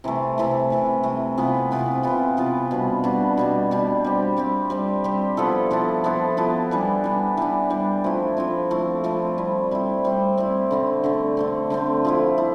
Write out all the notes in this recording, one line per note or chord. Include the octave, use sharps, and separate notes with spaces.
C3 E3 A3
C3 E3 A3
C3 E3 A3
C3 E3 A3
C3 E3 B3 F4
C3 E3 B3 F4
C3 E3 B3 F4
C3 E3 B3 F4
B2 G3 D4
B2 G3 D4
B2 G3 D4
B2 G3 D4
G3 C4 G4
G3 C4 G4
G3 C4 G4
G3 C4 G4
F3 B3 E4 A4
F3 B3 E4 A4
F3 B3 E4 A4
F3 B3 E4 A4
E3 G3 D4
E3 G3 D4
E3 G3 D4
E3 G3 D4
F3 A3 C4 E4
F3 A3 C4 E4
F3 A3 C4 E4
F3 A3 C4 E4
G3 C4 E4
G3 C4 E4
G3 C4 E4
G3 C4 E4
D3 A3 C4
D3 A3 C4
D3 A3 C4
D3 A3 C4
F3 A3 E4
E4